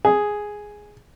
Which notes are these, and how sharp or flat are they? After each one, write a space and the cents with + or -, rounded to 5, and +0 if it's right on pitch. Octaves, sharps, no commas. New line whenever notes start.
G#4 +0